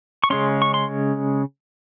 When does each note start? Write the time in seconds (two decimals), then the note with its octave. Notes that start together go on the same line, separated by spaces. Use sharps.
0.24 C#6
0.30 C#3 G#3 C#4 C6
0.62 C#6
0.74 C6